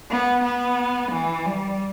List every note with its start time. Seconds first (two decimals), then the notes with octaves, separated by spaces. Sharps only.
0.10 B3
0.44 B3
1.12 E3
1.46 G3